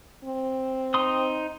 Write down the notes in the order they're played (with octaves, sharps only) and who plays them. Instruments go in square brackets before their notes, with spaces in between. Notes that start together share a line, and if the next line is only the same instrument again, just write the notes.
[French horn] C4
[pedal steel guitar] D#4 C6 D#6